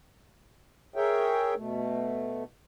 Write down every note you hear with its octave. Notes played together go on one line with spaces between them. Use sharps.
G#4 A#4 C#5 E5 G5
B2 A3